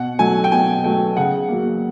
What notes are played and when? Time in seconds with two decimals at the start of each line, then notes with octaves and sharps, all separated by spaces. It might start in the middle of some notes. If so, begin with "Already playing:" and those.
Already playing: B2 F#5
0.19 F#3 A3 G#5
0.44 G5
0.52 B2 G#5
0.84 F#3 A3 G5
1.17 C#3 F#5
1.49 F#3 A#3